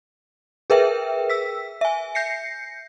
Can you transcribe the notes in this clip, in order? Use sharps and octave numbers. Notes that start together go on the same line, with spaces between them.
G#4 A#4 B4 E5 G5
E6 B6
E5 G#5
G6 A#6 C7 C#7